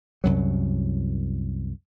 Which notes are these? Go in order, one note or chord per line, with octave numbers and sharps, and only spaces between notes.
C2 F#2 F#3